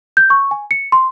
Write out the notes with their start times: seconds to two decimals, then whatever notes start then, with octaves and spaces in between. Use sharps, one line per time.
0.17 G6
0.30 C#6
0.51 G#5
0.71 C#7
0.92 C6